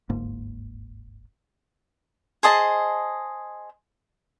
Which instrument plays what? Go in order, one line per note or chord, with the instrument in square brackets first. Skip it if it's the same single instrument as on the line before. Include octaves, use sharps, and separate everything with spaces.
[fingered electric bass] D1 G1 G#2 A#3
[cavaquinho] G#4 C5 D#5 A5